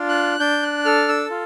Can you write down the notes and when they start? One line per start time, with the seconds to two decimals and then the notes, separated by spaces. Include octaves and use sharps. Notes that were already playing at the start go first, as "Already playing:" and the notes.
Already playing: D4 F4
0.08 F#6
0.40 D4 G6
0.63 F#6
0.85 A4 F6
1.09 E6
1.30 F4